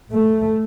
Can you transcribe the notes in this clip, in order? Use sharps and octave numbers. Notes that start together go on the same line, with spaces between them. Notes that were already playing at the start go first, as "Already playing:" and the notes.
A3